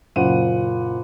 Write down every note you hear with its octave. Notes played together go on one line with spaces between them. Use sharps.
F#1 A#2 F#5 D#7